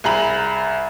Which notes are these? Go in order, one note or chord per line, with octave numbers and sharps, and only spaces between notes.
C2 G#4 A#5 B5 F#7